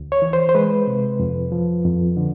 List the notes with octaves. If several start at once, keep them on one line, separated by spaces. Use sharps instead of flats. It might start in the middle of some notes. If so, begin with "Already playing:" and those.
Already playing: D2
C#5
E3
C5
C5
G#3 B4
C3
F2
F3
F2
D3